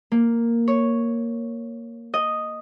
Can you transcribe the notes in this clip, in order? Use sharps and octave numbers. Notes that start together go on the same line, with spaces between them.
A#3
C#5
D#5